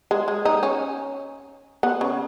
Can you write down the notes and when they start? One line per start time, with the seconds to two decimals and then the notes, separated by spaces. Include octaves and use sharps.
0.11 G#3
0.28 G#3
0.45 D#4
0.63 C#4
1.83 B3
2.01 C#3